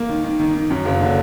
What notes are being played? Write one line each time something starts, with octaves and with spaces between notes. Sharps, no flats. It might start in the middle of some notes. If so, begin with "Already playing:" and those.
Already playing: A#3
D#3
D#3
D#3
D#3
F#2
F#1
D3